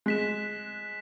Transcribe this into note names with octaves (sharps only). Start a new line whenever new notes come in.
G#3 F#6 B6 E7